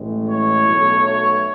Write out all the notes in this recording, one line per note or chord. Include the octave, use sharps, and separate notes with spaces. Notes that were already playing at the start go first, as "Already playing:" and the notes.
Already playing: A1 A2 G#3
C#5
B1 B2 F#3 A3
C#5